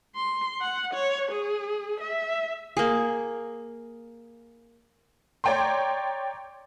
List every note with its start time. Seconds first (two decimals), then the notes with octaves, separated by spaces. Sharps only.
0.16 C6
0.61 F#5
0.94 C#5
1.32 G#4
2.01 E5
2.77 A#3 G#4
5.44 C#5 D5 G5 A#5 C6